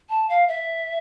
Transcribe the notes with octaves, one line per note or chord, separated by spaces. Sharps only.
A5
F5
E5